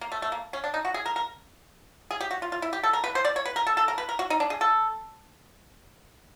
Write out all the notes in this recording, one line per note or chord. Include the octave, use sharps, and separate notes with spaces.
A#3
A3
A3
A#3
C#4
D4
D#4
F#4
G#4
A#4
A#4
G#4
G4
F#4
F4
F4
E4
G4
A4
A#4
B4
C5
D5
C#5
B4
A#4
A4
A4
A#4
B4
A#4
F#4
D#4
D4
G#4
A4